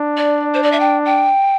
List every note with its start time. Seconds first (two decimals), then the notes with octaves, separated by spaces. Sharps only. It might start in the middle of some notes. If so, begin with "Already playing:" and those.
Already playing: D4
0.17 D5
0.54 C5
0.63 D5
0.72 E5
0.80 G5
1.05 G5